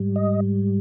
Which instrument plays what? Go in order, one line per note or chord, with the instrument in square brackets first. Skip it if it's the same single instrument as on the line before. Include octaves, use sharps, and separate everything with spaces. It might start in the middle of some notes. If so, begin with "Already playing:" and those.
Already playing: [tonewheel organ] G#2 G3
D#5